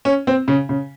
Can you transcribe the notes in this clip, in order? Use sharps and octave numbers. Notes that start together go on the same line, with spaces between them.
C#4
C4
C#3
C#3